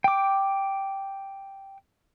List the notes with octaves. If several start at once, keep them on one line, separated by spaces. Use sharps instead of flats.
G5 D6